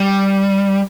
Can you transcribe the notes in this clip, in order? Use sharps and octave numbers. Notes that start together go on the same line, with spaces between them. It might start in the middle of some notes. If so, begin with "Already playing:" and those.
Already playing: G3